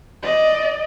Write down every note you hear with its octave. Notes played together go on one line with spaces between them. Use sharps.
D5 D#5